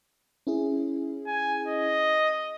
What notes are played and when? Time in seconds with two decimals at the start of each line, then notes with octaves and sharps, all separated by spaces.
0.47 C#4 E4 G#4
1.27 G#5
1.68 D#5